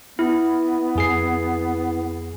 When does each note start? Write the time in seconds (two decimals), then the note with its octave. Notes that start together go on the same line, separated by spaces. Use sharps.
0.19 B3 E4
0.96 F2 G#4 C7